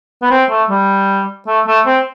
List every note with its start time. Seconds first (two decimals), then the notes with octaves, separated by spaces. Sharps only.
0.22 B3
0.30 C4
0.49 A3
0.69 G3
1.47 A3
1.66 A3
1.86 C4